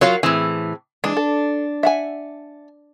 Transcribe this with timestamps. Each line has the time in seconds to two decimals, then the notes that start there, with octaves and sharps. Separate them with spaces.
0.01 F#3 F4 F#4 A#4 C#5 F5
0.23 A2 E3 C4 G#4
1.04 E3 G#3 D4
1.17 A4
1.83 E5 F#5 G#5